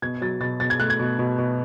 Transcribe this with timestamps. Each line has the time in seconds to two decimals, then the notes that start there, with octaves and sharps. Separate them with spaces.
0.02 B2 G#6
0.21 F#3 A6
0.40 B2 A6
0.60 B2 A6
0.70 G#6
0.80 A3 F#6
0.90 G#6
1.00 B2
1.19 B2
1.38 B2